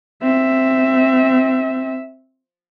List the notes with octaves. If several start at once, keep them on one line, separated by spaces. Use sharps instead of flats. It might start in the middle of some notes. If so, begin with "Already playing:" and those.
C4 E5